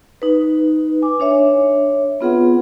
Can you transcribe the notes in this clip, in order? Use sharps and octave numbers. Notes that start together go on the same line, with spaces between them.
D#4 B4
G#5 D6
D4 C#5 E5
B3 C4 F4 G#4 B4 F#5